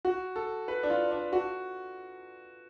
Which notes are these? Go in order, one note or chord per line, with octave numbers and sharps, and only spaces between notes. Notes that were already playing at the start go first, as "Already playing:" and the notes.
F#4
A4
B4
D4
F4
D4
F#4